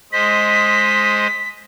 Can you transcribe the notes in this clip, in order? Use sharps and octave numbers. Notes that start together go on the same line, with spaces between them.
G#3 C5 D#5 B6